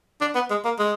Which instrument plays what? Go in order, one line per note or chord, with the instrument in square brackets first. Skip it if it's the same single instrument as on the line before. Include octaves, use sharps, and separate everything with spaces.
[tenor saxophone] D4
B3
G#3
A#3
G#3